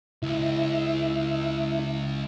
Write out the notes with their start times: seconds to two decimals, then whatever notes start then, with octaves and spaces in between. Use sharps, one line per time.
0.23 C#2 E4